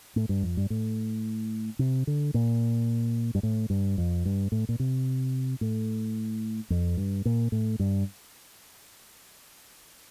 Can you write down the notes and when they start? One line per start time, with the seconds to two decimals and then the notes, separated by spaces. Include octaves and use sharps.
0.16 A2
0.29 G2
0.43 F2
0.57 G2
0.70 A2
1.79 C3
2.07 D3
2.34 A#2
3.35 G2
3.43 A2
3.70 G2
3.98 F2
4.25 G2
4.52 A2
4.69 A#2
4.79 C3
5.61 A2
6.70 F2
6.97 G2
7.25 A#2
7.52 A2
7.79 G2